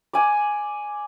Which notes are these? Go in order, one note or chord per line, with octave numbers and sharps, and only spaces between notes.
D5 G#5